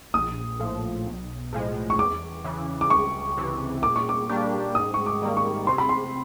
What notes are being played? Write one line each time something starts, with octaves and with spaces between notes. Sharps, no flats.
A#1 D#6
A2 F3
B1
A2 F3 G#3
C#6
E2 D6
C#3 E3
D6
C#2 C#6
C3 E3
A#2 D6
C#6
D6
G3 A#3 D4 G4
G#2 D#6
C#6
D6
D#3 G3 A#3
C#6
C3 C6
B5
C6